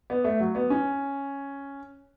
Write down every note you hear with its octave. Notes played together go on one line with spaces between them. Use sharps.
B3
A3
F#3
B3
C#4